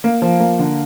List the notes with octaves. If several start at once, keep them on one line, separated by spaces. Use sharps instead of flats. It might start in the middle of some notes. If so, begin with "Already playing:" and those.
A#3
F3
A#3
D3